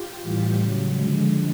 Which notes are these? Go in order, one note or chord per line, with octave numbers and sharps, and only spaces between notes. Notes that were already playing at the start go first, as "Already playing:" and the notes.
Already playing: F4 G4
A2 E3 G3
C#3 F#3
D3 F3 G#3